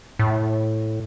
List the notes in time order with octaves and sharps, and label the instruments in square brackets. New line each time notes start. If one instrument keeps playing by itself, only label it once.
[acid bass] A2